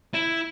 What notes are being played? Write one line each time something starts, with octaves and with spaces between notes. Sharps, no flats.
E4